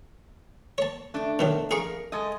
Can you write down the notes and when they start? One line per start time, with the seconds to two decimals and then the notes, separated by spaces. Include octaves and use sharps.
0.78 C#5 A5
1.14 A3 D4
1.39 B2 D#3 F#3
1.71 G#4 A#4 F5 C#6
2.12 G#3 A4 D#5